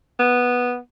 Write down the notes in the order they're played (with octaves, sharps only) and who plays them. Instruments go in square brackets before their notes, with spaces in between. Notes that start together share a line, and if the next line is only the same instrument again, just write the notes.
[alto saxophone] B3